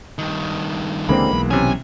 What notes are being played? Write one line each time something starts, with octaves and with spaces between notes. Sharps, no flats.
G2 D#3
C#2 D3 E3 G#3 A#3 C4 B5
B1
C3 E3 C#4 G#5